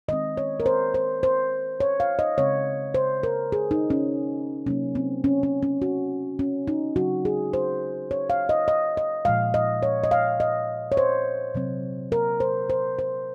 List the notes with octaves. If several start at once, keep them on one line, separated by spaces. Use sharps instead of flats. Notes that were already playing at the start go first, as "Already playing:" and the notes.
D#3 G#3 C4 D#5
C#5
A#4
C5
C5
C5
C#5
F5
D#5
C#3 G#3 C4 C#5
C5
A#4
G#4
D#4
C#4
C3 F#3 A#3 C#4
C4
C#4
C#4
C#4
F#4
C#4
D#4
C#3 F#3 C4 F#4
G#4
C5
C#5
F5
D#5
D#5
D#5
A#2 F3 G#3 F5
D#5
C#5
D#5
F5
D#5
C#5
C5
C3 F#3 C4
A#4
C5
C5
C5